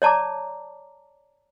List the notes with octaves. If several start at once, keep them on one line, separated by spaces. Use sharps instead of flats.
C#5 D5 A5 A#5 D6